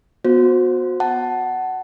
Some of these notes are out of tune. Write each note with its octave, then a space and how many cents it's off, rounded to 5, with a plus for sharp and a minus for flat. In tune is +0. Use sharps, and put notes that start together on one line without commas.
B3 +0 F#4 -25 C5 +5
F#5 +15 A5 +0